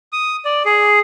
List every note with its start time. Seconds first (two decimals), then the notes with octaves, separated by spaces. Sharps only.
0.12 D#6
0.45 D5
0.65 G#4